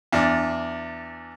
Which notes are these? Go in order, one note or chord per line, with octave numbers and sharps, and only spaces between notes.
E2 D4